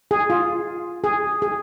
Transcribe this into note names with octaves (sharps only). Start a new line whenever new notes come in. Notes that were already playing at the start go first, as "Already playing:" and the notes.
G#4
F4
G#4
G#4